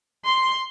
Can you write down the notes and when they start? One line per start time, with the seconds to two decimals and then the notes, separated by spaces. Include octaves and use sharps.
0.25 C6